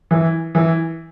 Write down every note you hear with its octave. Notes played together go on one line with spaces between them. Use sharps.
E3
E3